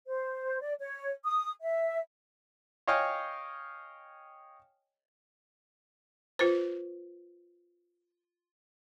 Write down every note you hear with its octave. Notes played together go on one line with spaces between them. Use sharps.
C5
D5
C#5
D#6
E5
C#5 D#5 F5 G5 G#5 F6
F4 B4 C5